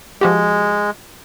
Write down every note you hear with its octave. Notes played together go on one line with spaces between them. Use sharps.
F3 G#3 F#4 G4